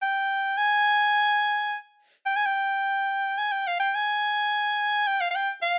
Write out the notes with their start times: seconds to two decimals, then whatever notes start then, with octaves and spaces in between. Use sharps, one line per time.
0.02 G5
0.58 G#5
2.26 G5
2.37 G#5
2.46 G5
3.38 G#5
3.52 G5
3.67 F5
3.80 G5
3.95 G#5
5.07 G5
5.21 F5
5.31 F5
5.35 G5
5.62 F5